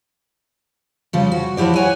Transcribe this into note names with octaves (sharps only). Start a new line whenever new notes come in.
C#3 F3 G3
F#4
F3 F#3 E4 G4 D5
C#5 F#5 G#5